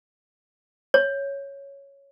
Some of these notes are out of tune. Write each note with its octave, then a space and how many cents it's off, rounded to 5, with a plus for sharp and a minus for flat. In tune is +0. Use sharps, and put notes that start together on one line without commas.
C#5 +0